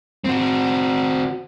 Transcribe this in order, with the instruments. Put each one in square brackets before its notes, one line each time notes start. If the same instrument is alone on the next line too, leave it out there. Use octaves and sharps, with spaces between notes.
[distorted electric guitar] C4 F#4